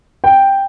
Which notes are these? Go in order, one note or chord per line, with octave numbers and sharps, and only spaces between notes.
G5